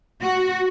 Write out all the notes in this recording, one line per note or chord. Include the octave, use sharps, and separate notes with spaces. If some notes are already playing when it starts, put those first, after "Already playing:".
F#4